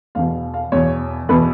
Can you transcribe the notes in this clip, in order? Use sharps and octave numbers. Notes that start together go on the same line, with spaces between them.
E2 B2 F5
F5
E2 B2 C#5
E2 B2 B4